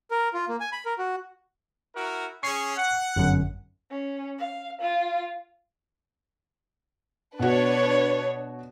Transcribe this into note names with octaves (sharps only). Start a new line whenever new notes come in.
A#4
F4
A#3
G#5
B5
A#4
F#4
E4 F#4 A#4
C#4 G#4 G#5 C#6 C7
F#5
G1 F#2
C#4
F5
F4
B2 D4 F#4 B4 C#5